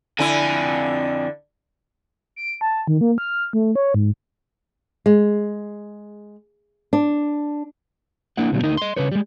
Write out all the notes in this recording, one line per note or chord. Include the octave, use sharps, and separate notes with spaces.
F2 D3 E4 G#5
D7
A5
D#3
A#3
F6
A3
C#5
G#2
G#3
D4
A#3 D4 E4 F#5
D2 B2 F#3 G3
D2 D#4 A#4 D#5
D#5 C6
C#3 B4 C#5
G3 G#3